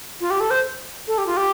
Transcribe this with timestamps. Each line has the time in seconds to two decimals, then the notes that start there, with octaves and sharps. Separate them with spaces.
0.21 F4
0.30 G4
0.40 A4
0.50 C5
1.08 A4
1.18 G4
1.26 F4
1.37 G4